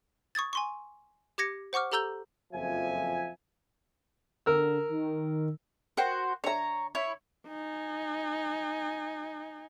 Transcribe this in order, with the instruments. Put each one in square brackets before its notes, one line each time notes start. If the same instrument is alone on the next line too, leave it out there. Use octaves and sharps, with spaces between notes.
[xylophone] C#6 D#6 G#6 A6
G#5 C6 C#6
G4 D6 G#6 A#6 C#7
C5 F#5 C#6 D6 F6
G4 A4 A#5 E6 G6 G7
[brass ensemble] F#1 F2 F3 E5 G#5
[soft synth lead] D3 [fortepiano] A#4 E6
[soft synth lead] D#3
[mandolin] F#4 C5 [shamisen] A#4 G5
[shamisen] D3 E5 [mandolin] C#5 A#5
[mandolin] E4 C#5
[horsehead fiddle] D#4 G#5